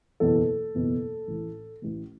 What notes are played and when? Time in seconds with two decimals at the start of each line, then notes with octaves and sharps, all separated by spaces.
0.20 F#1 E2 B2 A4
0.74 F#1 E2 B2
1.28 A1 A2 E3
1.82 A1 A2 E3